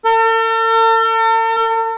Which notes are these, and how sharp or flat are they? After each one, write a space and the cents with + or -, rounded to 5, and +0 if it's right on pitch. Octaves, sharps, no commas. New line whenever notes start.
A4 +45